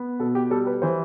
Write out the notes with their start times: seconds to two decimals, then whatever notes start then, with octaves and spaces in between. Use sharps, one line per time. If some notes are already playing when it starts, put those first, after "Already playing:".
Already playing: B3
0.19 B2 A4
0.35 G4
0.50 G3 A4
0.67 B4
0.82 E3 C5